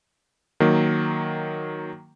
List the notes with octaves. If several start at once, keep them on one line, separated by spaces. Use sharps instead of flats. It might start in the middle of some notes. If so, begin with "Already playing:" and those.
D#3 F#3 A#3